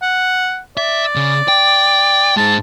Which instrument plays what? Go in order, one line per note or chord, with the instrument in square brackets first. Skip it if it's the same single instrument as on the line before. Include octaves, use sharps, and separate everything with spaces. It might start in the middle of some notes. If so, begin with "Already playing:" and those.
[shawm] F#5
[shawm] D5 [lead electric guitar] E5
[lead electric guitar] C#3
G5
[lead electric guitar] G#2 G#3 [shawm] A5